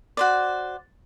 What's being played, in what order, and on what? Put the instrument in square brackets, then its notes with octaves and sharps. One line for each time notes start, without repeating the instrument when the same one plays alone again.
[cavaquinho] F#4 C5 D5